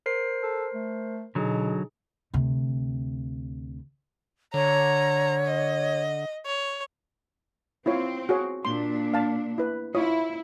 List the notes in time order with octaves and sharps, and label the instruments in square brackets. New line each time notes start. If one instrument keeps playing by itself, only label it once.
[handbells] A#4 C5 C7
[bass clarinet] A4
A3
[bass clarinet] B2 [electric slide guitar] D3 F#3 [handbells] D#4 G#4
[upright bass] D2 C3
[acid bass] D3 [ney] C#5 [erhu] A#5
[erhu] D#5
C#5
[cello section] C4 [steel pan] E4 F4 C#5
[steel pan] F#4 G#4 C#5
[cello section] A#2 D4 [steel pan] C6
[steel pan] F5 A5
E4 B4
[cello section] E4 [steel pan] F4 C#5 D#6